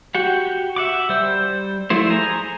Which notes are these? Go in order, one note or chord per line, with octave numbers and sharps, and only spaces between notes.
F#4 G4 F#5
E5 F#5 D6
G3 C5 E6
F3 A3 E4 C5
G#4 C5 G#5 A#5